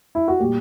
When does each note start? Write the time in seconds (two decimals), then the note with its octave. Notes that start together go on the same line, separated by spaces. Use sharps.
0.15 E4
0.28 F#4
0.40 A#2 G3 G4